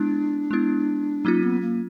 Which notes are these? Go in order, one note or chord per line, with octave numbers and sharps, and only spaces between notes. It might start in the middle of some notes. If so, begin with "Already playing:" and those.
Already playing: G#3 B3 D4 E4
G#3 B3 E4
F#3 A#3 C#4 D#4 F4
B3
A#3